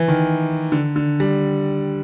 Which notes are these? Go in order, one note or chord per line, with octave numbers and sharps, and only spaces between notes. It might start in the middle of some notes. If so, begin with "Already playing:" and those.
Already playing: E3
D#3
D3
D3
G3